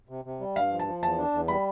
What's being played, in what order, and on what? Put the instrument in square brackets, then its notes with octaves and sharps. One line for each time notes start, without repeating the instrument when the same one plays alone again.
[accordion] C3
C3
G3
[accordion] G2 [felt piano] F5
[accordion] F3
[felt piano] A5
[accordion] F3
[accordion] E2 [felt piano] A5
[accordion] D4
E2
[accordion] G3 [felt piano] B5